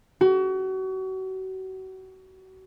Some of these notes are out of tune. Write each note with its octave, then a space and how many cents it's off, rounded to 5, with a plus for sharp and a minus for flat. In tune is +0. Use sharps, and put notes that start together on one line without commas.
F#4 +35